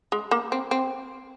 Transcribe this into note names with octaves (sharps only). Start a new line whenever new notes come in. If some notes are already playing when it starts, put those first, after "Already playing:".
G#3
A#3
C4
C4